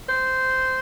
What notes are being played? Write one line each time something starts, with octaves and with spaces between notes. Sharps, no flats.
C5